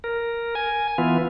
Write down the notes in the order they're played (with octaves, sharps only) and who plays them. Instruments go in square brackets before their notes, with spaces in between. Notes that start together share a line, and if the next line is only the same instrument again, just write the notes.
[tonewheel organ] A#4
G#5
E3 B3 F4